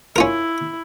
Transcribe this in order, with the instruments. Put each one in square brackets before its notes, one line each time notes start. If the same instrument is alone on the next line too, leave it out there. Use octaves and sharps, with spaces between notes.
[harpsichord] C#4 F4 A#4 [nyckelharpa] E4